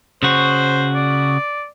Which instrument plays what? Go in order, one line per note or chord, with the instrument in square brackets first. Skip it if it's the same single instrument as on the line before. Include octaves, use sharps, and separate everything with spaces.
[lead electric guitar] C#3 F#4 [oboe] C5
[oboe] D5